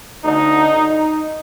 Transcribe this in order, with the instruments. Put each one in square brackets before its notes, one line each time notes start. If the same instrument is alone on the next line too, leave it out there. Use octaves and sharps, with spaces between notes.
[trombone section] D2 D3 D#4
D#4